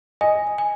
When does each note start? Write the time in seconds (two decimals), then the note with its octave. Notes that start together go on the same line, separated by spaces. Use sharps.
0.21 D#5 G#5
0.58 G#5